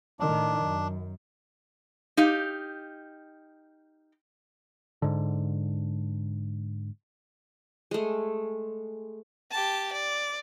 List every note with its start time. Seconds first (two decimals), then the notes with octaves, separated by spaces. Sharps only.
0.20 A2 D#3 D4
0.62 F#2
2.17 D#4 G4 F5
5.02 G#2 D3
7.91 G#3 A3
9.51 G4 A5
9.92 D5